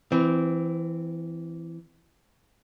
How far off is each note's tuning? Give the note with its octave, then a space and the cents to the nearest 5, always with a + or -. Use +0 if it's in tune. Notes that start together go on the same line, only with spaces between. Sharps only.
E3 +10 C4 -15